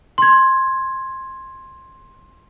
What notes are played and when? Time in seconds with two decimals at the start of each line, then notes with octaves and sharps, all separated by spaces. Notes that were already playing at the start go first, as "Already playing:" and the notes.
0.18 C6 G#6